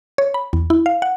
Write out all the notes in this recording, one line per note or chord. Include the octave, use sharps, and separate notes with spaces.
C#5
B5
E2
E4
F5
F#5